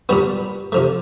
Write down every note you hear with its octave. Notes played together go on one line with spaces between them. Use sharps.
A#2 G3 B3 F#4
C3 F3 A3